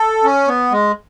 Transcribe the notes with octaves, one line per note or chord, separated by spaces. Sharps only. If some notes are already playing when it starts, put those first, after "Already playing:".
Already playing: A4
C#4
B3
G#3